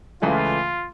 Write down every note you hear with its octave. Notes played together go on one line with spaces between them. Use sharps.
C#2 C#3 E3 A3 C#4 F4